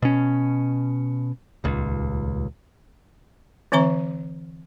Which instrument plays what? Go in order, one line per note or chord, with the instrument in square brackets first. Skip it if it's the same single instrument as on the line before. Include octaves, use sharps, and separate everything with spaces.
[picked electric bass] B2 C#4
D#1 C#2
[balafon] D3 E3 C4 E5 A#5 C#6